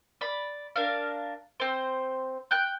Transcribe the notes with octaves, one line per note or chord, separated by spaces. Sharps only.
D5 B5
D4 A#4 F5
C4 C5
G5 F#6 G6